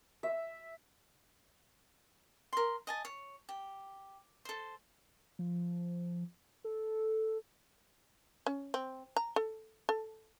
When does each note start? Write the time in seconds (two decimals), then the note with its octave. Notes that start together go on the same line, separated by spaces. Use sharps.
0.23 E5
2.53 A#4 C6
2.87 D#5 G#5 A5
3.05 C#5
3.49 G4
4.45 A4 C5
5.39 F3
6.64 A4
8.46 C#4
8.74 C4
9.16 A#5
9.36 A4
9.89 A4